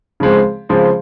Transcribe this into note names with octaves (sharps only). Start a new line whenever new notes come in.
C#3 F3 G#3 C4
C#3 F3 G#3 C4